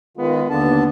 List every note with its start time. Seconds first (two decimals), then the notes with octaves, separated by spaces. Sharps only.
0.17 D#3 G#3 B3 F4
0.50 D#2 D3 B3 A5